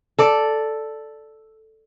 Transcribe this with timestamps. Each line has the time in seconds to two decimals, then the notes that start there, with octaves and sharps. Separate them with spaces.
0.19 A4 D5